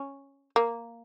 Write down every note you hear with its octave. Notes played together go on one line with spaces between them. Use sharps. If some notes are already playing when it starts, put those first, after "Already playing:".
Already playing: C#4
A#3